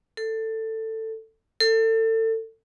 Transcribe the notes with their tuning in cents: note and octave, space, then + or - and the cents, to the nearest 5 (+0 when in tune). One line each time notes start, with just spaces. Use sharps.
A4 +15
A4 +30